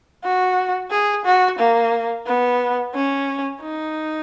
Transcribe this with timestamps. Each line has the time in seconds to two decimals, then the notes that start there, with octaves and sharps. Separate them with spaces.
0.24 F#4
0.91 G#4
1.25 F#4
1.59 A#3
2.26 B3
2.94 C#4
3.61 D#4